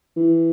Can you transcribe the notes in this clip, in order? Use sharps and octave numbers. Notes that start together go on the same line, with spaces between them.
E3